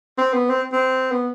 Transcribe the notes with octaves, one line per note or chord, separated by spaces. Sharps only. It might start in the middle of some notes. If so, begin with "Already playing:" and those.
C4
B3
C4
C4
B3